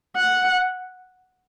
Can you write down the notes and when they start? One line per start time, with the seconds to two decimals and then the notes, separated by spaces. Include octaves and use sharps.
0.16 F#5